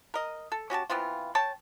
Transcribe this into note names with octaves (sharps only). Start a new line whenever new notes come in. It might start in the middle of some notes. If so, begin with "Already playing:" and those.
A#4 D#5
A4
C#4 F#4 G4 A5
E3 B3 C4 F4
C#5 G5 A5